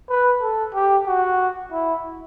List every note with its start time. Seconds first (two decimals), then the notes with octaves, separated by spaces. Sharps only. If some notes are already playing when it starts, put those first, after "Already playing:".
0.09 B4
0.42 A4
0.74 G4
1.07 F#4
1.72 E4